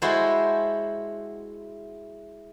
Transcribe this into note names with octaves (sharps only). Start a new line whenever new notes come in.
G#3 E4 F#4 A4 C5